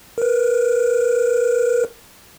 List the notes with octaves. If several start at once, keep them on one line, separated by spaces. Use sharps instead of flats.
A#4 B4